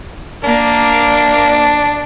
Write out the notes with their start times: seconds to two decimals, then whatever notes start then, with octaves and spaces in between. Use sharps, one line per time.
0.44 A#3 D4